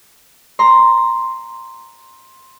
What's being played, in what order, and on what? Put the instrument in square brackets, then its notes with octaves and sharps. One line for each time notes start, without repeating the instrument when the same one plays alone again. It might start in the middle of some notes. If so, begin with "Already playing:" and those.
[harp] A#5 C6